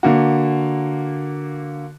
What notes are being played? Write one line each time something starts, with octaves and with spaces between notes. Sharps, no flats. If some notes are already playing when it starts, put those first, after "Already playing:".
D3 A#3 F#4